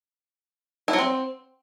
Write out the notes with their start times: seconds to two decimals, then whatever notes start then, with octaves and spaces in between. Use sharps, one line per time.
0.88 E4
0.93 F#3
0.99 C4